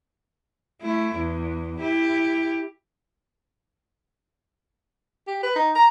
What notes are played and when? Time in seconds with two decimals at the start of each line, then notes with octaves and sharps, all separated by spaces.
0.82 A3 E4
1.16 E2
1.80 E4 G4
5.28 G4
5.43 B4
5.56 D#4
5.75 A#5